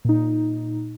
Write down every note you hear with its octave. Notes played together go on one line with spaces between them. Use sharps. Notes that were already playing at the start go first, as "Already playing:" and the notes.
A#2 D#4